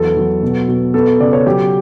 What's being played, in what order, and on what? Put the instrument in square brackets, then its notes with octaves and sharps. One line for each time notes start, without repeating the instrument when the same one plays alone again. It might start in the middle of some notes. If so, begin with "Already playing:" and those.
Already playing: [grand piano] E2 F#3 A4
F#3
B2
B2
B3 A4
C#3 D5
C#5
F#3 G4